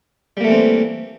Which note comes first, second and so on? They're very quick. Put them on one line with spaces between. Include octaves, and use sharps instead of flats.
G3 A#3 A3 E3 C4